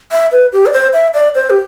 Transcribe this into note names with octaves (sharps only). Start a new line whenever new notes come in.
E5
B4
G4
D5
C5
E5
D5
C5
G4